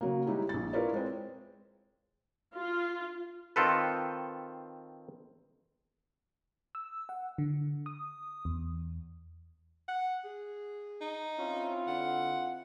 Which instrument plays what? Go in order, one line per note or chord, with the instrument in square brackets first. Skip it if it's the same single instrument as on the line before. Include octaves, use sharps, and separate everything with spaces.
[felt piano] C#3 F#3 A#3
G3 G#3 D#4 E4 G4
A#1 A6
E4 F4 A#4 B4 C#5 D5
G#3 C4
[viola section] F4
[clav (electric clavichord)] D#3 C4 F4 A4 B4
[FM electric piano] E6
F#5
D3
D#6
E2
[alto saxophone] F#5
G#4
[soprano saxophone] D#4
[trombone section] C4 E4 F4 [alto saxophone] C#4
[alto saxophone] D3 [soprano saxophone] F#5